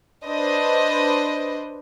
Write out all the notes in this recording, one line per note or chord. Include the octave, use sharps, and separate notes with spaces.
D4 B4 C5 D#5